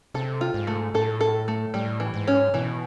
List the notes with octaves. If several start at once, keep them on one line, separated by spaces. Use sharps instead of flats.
C3 A4
F4
G#2
A3
A2 A4
A4
A3
A2 G3
E3
G#2
C#4
B2 E3